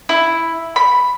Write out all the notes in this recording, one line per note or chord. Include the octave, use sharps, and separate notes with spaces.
E4
B5